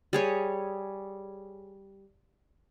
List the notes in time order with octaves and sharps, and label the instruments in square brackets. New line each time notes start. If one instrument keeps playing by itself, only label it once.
[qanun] G3 G#4 C#5